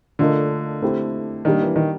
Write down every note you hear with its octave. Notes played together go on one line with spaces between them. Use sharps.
D3 A3 D4 F4 A#4 D#5
A3 C4 E4 G4
D#3 G3 A#3 D4
E3
D#3